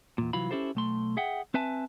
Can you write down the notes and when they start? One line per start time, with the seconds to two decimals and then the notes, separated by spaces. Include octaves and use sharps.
0.18 E2 A#2
0.33 C2 E3 F#3 F4 B5
0.51 C#4 D#4 E4 G4 A4 C5
0.75 B1 A3 C6
1.17 G#4 E5 F#5 G5
1.54 C4 B4 E5 G#5 A5